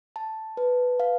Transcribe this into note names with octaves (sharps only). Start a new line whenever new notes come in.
A5
B4
F5